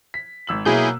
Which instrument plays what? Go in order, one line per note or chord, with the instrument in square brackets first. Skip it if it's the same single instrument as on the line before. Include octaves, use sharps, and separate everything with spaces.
[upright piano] B6
G#1 E6 F#7
[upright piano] B2 F#3 A#3 [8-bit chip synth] E4 G#4 G6